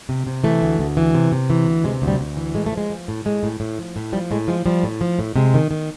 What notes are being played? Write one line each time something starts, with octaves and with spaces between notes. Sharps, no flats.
C3
C3
E3 A3
D2
D2
E3
C3
C3
E3
D2
C3 G#3
D2
G3
D2
E3
A2 G#3
A3
F3
G#3
F3
A2
A2 G#3
A2
A2
F3
A2
F3 G3
A2 G#3
F3 G#3
F3 G3
A2
F3
A2
C3 G#3
D#3
D#3